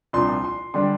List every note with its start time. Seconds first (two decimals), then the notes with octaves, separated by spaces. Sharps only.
0.13 C2 A#2 F3 D4 C6
0.45 C6
0.74 D3 G3 D4 C6